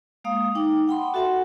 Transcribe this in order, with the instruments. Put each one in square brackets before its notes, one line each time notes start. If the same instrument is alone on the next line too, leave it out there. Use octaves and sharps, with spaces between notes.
[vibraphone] G#3 A#3 F5 D#6
D#4 G5 D6
F#5 G5 B5 C6
F#4 A4 E5 F#5 G#5